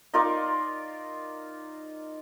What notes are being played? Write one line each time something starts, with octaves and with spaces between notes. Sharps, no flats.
D#4 F4 A#4 D5